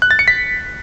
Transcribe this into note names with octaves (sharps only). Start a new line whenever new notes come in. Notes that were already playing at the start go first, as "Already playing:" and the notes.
F#6
A6
C#7
B6